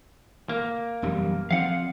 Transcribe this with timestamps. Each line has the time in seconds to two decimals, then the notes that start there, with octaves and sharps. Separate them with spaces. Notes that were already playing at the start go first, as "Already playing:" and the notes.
0.49 A#3
1.02 E1 F#2 G3
1.51 F3 C4 F5 F#5